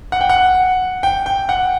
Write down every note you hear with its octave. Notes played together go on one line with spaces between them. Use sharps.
F#5
G5
F#5
G5
G5
F#5